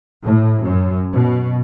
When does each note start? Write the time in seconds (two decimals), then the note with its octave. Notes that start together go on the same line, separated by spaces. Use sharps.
0.22 A2
0.62 F#2
1.12 B2